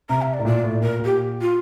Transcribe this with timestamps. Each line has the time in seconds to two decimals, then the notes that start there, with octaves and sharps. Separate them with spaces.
0.09 C3 A#5
0.22 E5
0.34 D5
0.39 A2
0.45 A#2 D5
0.64 A2
0.81 A#2 A#4
0.99 A#2
1.05 G4
1.41 F4